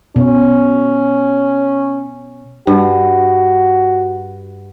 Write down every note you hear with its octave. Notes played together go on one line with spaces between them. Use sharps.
B2 C#4
G2 F#4